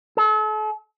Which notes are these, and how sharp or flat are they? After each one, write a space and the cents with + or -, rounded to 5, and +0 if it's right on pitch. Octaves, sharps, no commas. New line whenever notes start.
A4 -40